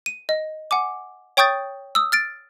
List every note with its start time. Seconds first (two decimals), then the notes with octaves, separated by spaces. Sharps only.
0.06 D#7
0.29 D#5
0.71 F#5 G#5 D6
1.37 C#5 G5 C#6 D#6 G6 A6
1.95 D#6 E6
2.12 F6 A6 D7